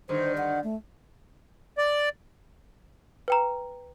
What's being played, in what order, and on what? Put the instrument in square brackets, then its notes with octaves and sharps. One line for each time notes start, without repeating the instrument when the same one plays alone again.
[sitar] G2 D3 D#3 [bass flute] C5
[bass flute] F#5
A3
[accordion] D5
[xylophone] B4 G5 A#5